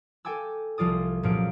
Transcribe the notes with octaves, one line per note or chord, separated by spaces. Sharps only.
A4 G5 G#5 D6 E6
C2 F3 F4 D5 D#6
F#2 A#2 F3 G#4 A#4 D7